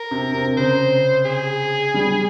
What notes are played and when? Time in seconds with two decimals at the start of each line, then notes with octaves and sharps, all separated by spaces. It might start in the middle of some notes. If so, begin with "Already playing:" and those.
Already playing: A#4
0.11 C3
0.34 C3
0.57 C#3 C5
1.25 G#4
1.94 G3